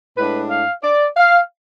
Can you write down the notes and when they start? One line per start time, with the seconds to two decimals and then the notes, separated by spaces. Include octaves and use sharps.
0.17 A2 G#3 D4 B4
0.50 F5
0.84 D5
1.17 F5